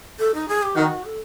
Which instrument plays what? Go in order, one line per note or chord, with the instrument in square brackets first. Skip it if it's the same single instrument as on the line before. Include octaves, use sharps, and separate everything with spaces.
[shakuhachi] A4
D#4
G#4
G4
[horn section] D#3 [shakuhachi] F#4
[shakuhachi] A4